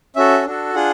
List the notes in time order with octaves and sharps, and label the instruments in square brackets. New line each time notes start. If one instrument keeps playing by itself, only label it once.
[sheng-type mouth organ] C#4 F#4 A4 E5
D4 F#4 A4
D4 F4 G#4 F#5